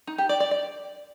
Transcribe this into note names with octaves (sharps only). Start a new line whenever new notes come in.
D#4
G4
D5
D5
D5